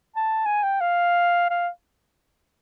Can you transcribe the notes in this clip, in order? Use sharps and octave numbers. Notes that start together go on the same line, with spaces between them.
A5
G#5
G5
F5
F5